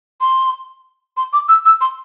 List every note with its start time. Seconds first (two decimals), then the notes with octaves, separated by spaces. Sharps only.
0.21 C6
1.17 C6
1.33 D6
1.49 E6
1.65 E6
1.81 C6